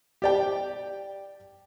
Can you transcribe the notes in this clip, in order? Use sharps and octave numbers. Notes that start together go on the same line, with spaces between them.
G4 D5 G5